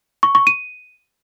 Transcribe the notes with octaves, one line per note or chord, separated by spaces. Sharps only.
C#6
C#6
D#7